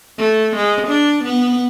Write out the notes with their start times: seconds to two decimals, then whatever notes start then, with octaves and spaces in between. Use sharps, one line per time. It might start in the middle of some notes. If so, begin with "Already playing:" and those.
0.18 A3
0.56 G#3
0.88 D4
1.24 B3